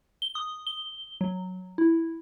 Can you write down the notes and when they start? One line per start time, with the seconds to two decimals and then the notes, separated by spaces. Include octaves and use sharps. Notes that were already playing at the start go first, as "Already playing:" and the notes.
0.22 G7
0.35 D#6
0.67 G7
1.21 F#3
1.78 E4